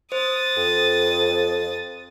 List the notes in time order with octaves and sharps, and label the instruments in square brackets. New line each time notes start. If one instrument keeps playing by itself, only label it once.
[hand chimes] C5 [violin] D#6 A6
[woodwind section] F2